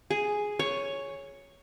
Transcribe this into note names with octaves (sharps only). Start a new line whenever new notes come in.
G#4
C#5